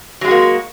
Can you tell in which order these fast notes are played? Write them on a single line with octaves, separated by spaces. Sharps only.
F#3 G#3 F#4 A#3